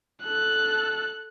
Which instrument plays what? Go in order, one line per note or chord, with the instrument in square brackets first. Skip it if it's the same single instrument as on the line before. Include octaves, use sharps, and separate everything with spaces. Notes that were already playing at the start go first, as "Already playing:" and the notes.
[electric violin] A4 F#6